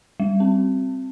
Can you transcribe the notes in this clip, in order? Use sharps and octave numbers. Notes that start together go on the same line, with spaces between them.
G3
C4